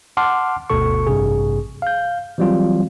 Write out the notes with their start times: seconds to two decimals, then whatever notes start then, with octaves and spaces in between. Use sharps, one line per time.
0.17 F#5 A5 C6 D6 F6 C7
0.70 G1 D2 B2 A4 C#6
1.07 A1 G2 C3 G#4
1.82 F5 G6
2.38 E3 F#3 G3 C4 F4